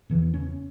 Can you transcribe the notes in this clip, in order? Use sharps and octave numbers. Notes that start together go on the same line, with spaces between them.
E2 C#3 E3
C#4